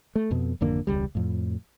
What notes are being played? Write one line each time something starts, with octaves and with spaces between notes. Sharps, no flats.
A3
F2 B2
G#1 F2 D3 A#3
E1 C#2 G3
F2 A2